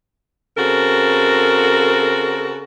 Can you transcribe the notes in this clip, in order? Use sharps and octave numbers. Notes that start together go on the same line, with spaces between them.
C#3 C4 F#4 A4 A#4